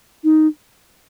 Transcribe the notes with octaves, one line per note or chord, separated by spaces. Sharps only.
D#4